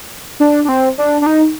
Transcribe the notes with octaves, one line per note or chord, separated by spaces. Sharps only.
D4
D4
C4
D4
D4
D#4